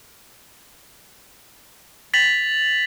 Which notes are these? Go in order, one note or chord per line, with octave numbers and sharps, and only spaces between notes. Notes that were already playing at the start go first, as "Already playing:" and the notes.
A6 B6 F7 F#7